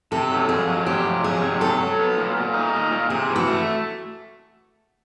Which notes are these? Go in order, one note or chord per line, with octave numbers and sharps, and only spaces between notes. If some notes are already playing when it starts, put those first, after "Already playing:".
C3 A4
F#3
F2 G#4
F#3
C3 G4
F2
F#3 G#4
C3
F#3 A4
F#3
B3
A#2
A#2
D#4
A#2
A#2
C3 G#4
E3
F#4
A3